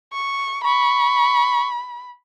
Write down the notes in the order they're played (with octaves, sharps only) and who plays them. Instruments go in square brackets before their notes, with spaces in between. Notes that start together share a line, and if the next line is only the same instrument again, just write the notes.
[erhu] C#6
[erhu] B5 [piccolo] C#6